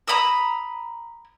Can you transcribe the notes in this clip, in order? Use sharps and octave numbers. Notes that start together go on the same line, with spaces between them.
A#5 B5 D#6 E6